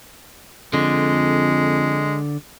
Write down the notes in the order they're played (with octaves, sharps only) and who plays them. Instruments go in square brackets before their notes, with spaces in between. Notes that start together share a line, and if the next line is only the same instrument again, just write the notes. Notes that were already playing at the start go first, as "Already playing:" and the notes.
[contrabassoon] F2 [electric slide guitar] D3 [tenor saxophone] G#3